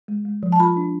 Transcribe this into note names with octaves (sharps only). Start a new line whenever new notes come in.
G#3
G#3
F3
A5
F4 B5
D4